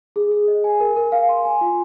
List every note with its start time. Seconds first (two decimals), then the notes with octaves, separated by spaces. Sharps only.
0.16 G#4
0.31 G#4
0.48 D#5
0.64 G#5
0.80 A#4
0.96 A#4
1.12 F5
1.29 C6
1.45 G#5
1.61 F4